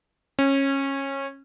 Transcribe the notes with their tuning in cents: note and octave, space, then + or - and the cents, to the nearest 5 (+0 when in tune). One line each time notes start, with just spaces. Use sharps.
C#4 -20